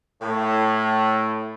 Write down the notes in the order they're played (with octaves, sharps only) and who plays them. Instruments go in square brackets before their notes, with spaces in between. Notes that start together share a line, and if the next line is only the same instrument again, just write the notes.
[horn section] A2